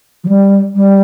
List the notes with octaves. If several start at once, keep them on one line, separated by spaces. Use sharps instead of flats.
F3
G3
G3